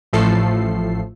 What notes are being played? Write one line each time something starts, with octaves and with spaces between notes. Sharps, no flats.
A1 A2 F3 A3 A4 C7